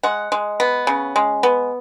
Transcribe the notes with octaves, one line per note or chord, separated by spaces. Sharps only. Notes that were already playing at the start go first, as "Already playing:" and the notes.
G#3 F#5
G#3
B3
C#3
G#3
B3